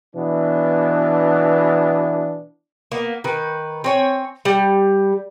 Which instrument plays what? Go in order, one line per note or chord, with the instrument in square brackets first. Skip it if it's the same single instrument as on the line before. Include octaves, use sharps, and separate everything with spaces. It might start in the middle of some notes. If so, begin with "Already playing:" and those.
[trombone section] B2 E3 B3 D4
[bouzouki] A#3 B3
D#3 B4
C4 C#5 G#5
G3